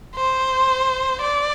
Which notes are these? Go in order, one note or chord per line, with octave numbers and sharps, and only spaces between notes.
C5
D5